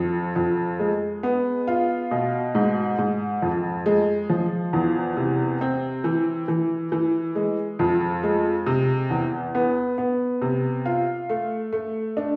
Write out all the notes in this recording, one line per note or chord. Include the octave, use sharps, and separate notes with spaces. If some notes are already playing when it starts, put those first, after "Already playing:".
Already playing: F2
F2
G#3
B3
F4
B2
G#2
G#2
F2
G#3
F3
E2
C3
C4
E3
E3
E3
G#3
F2
G#3
C3
E2
B3
B3
C3
F4
A3
A3
D4